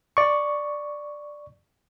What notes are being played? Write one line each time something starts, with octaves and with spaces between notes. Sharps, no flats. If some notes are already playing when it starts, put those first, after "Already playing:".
D5 C#6